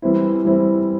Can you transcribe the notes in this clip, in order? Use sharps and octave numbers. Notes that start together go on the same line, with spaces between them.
E3 G3 C4 E4
E3 G3 C4 E4